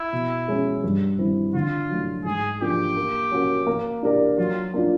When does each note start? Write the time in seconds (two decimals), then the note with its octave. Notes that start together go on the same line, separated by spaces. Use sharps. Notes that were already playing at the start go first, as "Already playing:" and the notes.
Already playing: E4
0.13 B2
0.48 G#3 C#4
0.84 G2
1.19 D#3 G3 C4 E4
1.54 D3 F4
1.90 F#3 A3
2.25 G#2 G#4
2.61 F3 A#3 D4 G4
2.96 A#3
3.31 C#4 F#4 A#4
3.67 A#3
4.03 D4 G4 A#4 D5
4.38 F#3 F4
4.74 A#3 D4 F4